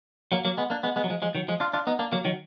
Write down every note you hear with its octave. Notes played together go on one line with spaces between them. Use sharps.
F#3 A#3
F#3 A#3
G#3 B3
A#3 D4
G#3 B3
G#3 B3
F#3
F3 G#3
F3 G#3
D#3 F#3
F3 G#3
D4 F4
D4 F4
B3 D#4
A#3 D4
F#3 A#3
D#3 F#3